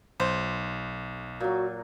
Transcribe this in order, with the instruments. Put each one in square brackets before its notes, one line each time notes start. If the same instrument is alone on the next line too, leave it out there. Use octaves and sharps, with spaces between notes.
[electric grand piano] B1 [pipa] C5
[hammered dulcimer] A#2 F#3 [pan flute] F#4